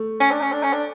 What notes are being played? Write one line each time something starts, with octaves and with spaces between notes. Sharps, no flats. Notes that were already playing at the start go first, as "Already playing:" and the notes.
Already playing: A3
C#4
D4
C#4
D4
C#4
D4